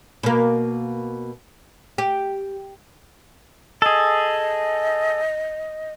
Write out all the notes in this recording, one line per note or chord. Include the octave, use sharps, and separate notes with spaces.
B2 A#3
G4
G#4 A4 D#5